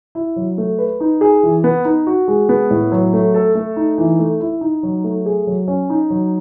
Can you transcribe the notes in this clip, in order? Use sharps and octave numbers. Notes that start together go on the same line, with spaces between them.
E4
F#3
A3
B4
D#4
G#4
E3
B3
D#4
F#4
G#3
B3
A2
F#3
A3
A4
A3
D#4
E3
A3
E4
D#4
F#3
A3
G#4
F#3
C#4
D#4
F#3